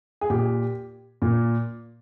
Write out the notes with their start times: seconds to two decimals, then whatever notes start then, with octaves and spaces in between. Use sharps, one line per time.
0.21 G#4
0.30 A#2 G4
1.22 A#2